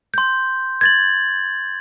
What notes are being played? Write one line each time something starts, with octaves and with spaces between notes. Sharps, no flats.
C6 G6
G#6 A6 F#7